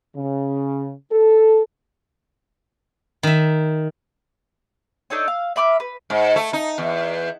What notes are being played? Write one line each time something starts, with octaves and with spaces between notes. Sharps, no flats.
C#3
A4
D#3 E5
D4 D#4 A4 C#5
F5
E5 B5 D6 F6
B4
G#2
A3
D#4
E2